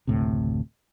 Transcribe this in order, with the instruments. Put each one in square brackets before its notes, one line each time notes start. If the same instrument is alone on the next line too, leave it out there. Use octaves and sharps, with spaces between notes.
[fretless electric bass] F#1 D2 A2 C3